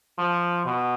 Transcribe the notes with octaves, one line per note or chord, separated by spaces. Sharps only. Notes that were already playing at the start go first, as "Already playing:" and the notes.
F3
B2